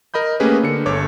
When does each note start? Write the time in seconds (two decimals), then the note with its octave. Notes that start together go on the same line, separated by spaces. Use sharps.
0.14 A#4 D#5 B5 G6
0.40 A3 A#3 C#4 G4 G#4 B4
0.63 D3 C#7
0.86 G1 A4 C#5 D6